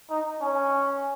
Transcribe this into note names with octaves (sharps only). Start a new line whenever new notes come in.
D#4
C#4